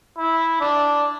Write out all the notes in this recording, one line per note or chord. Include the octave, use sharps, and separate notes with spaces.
E4
D4